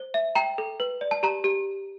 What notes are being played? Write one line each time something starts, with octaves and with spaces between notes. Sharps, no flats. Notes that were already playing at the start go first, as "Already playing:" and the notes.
Already playing: C5
E5
G5 A#5
A4
B4
D5
A5
G4 A#5
G4